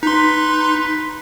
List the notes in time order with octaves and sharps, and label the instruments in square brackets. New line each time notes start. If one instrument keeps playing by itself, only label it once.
[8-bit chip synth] D#4 C6 [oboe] B4